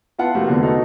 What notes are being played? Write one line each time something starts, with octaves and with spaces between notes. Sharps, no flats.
B3 E4 F4 F#5 A5
C3 F3 A3 A#3 F4 F#4
E2 D3 B3
B3 D#4 F#4 A4